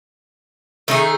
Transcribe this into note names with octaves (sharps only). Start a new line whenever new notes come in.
D#3 A3 D#4 G#4